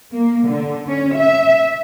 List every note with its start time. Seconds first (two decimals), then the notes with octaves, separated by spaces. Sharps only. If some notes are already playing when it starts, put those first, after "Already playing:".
0.13 A#3
0.48 D3
0.88 C#4
1.17 E5